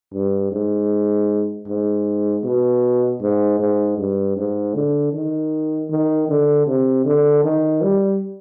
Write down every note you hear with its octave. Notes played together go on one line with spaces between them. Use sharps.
G2
G#2
G#2
B2
G#2
G#2
G2
G#2
D3
D#3
D#3
D3
C3
D3
D#3
G3